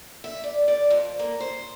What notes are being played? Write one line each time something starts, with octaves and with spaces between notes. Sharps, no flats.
E5
D5
D5
F2
A#3
C5